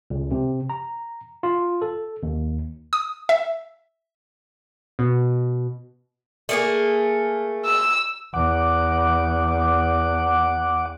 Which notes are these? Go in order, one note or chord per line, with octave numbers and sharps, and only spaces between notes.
C#2
C3
A#5
F4
A4
D#2
D#6
E5
B2
A3 A#3 G#4
E6
E2 F#5 D6